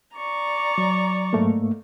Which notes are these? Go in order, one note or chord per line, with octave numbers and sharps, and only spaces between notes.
D5 A#5 C#6
F#3
G#2 A3 A#3